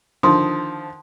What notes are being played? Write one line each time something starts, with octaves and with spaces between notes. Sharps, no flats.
D3 D#3 F3 A5 C6 D#6